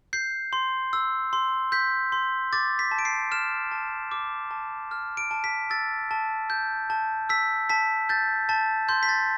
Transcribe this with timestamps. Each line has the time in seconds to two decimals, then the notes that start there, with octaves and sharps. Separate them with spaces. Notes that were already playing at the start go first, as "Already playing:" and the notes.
0.13 G6 C7
0.53 C6
0.93 E6
1.33 C6
1.72 G6 B6
2.12 C6
2.53 D6 A6
2.79 B6
2.91 A5
2.99 D7
3.05 C7
3.31 F6 E7
3.71 A5
4.11 D6
4.51 A5
4.91 F6
5.17 D7
5.31 A5
5.44 B6
5.70 E6 A6
6.11 A5
6.50 G6
6.90 A5
7.29 E6 B6
7.69 A5 B6
8.09 G6 A6
8.49 A5 A6
8.89 C6 G6
9.03 B6
9.09 A6